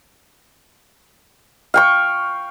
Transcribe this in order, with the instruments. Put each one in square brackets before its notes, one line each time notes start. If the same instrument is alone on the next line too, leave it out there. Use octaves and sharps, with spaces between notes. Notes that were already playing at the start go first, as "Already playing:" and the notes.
[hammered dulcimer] F5 G5 C#6